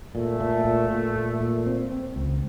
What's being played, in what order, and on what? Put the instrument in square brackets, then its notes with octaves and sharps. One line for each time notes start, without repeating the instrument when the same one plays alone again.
[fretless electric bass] A#2 [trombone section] A3
[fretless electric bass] A#2
A#2
A#2
A#2
A#2
C4
C4
C#2